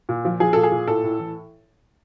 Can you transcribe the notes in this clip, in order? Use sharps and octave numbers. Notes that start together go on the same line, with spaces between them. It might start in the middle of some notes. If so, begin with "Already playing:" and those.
A#2
F3
F3 G#4
A#2 A4
G#4
A#2
A2 A4
A2
E3